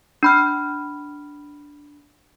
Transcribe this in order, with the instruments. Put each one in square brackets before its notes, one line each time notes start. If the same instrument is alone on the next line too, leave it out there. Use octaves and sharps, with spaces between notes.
[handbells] D4 B5 F6